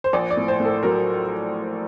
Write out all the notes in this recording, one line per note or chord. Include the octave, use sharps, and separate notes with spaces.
C5
A#1 D5
D5
A2
C5
A2
A4
F#3 A#4